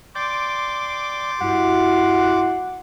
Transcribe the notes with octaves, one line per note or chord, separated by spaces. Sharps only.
D5 G5 C6 D6
G2 E4 F#4 F#5